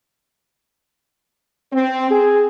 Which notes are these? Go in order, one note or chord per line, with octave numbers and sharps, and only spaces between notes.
C4
G#4